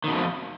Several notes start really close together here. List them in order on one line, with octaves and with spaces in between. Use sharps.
D#3 B2 F2